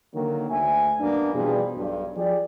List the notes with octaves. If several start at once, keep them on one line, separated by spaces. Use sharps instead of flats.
D3 D#3 F#3 A#3
D2 E5 G#5
F#2 A#3 B3 D4
B2 E3 F3 G3 D4 G#4
B1 G2
F3 G4 G#4 D5